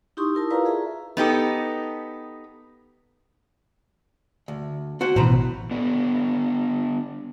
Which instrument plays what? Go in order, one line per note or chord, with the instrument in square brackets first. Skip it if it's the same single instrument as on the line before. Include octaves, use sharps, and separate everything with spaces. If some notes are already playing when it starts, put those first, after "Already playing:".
[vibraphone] D#4 E4 G4 C6 C#6 D#6
E4 A#4 A5
E4 F4 B4 D5 F5 A#5
G#4 E5 A#5
[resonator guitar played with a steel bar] B3 D#4 G4 A4
[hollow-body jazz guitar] D2
F#4 C5 F#5
[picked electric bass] A1 B2 E3 [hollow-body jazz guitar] C5 A#5 B5
[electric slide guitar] D3 B3 D5